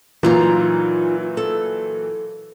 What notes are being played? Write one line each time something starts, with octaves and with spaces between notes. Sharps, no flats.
A#2 E3 F#3 D#4 F4 A#5
A4